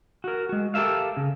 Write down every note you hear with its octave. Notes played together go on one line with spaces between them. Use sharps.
F#4 A#4
G#3 F#4
G4 A4 A#4 E5 F5
C#3